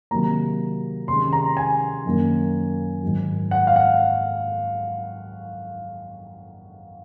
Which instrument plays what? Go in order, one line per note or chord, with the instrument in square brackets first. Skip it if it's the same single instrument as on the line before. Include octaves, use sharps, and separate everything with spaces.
[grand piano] C3 D#3 F#3 A#3 A#5
C3 D#3 G#3 C#4 C6
A#5
G#5
F#2 D#3 A#3 C#4
G#2 D#3 F#3
F#5
F5
F#5